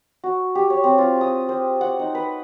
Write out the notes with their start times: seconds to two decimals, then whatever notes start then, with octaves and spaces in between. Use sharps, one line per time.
0.24 F#4
0.55 G4
0.70 C#5
0.84 C4
0.98 F4
1.21 D#6
1.49 C5
1.81 F#5
1.99 D#4
2.15 B4